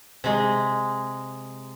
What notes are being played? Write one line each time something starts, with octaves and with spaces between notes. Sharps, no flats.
C3 G#3